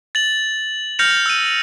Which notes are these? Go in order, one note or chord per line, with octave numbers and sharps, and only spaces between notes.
A6 F#7
F6 G6 A#6 C#7 F7
E6 D#7